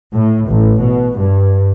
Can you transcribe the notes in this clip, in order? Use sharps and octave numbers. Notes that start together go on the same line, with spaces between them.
A2
A1
B2
G2